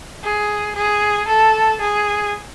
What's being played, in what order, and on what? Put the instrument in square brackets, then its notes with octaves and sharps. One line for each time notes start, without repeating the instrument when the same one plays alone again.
[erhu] G#4
G#4
A4
G#4